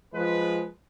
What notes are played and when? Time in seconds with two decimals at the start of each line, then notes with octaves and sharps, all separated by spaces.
0.14 F3 G#3 B4